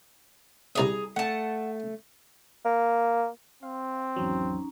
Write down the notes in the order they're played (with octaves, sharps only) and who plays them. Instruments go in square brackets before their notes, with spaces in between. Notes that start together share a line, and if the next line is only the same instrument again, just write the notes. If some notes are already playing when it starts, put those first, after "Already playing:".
[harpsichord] C2 D5 E5 [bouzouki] G#4 A#5
[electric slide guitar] A3 [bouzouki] F#5 A5
[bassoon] A#3
[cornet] C4 [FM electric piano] F5
[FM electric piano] G#1 E2 F#3 [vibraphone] C#4 D#4 A#5